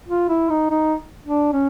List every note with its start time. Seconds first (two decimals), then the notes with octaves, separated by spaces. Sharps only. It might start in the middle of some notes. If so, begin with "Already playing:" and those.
0.08 F4
0.29 E4
0.50 D#4
0.70 D#4
1.25 D4
1.53 C#4